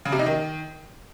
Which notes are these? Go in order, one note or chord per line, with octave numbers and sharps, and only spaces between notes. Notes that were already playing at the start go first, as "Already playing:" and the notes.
C#3
C3
D#4
D#3